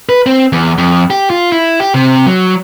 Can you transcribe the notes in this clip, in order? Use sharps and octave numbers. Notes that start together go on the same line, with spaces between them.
B4
C4
E2
F2
G4
F4
E4
G4
C3
F#3